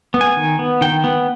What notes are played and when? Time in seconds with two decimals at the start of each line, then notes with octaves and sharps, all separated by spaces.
0.14 B3
0.21 G#5
0.37 D#3
0.59 B3
0.81 D#3 G5
1.04 B3